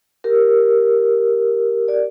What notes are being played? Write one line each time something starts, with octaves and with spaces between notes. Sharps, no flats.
G4 A#4
D5